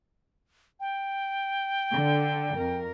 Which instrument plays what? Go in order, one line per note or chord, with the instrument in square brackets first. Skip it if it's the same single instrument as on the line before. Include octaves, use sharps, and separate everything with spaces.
[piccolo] G5
[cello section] D3
F2 A#4